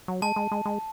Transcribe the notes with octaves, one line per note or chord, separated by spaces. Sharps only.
F#3
G#3 A5
G#3
G#3
G#3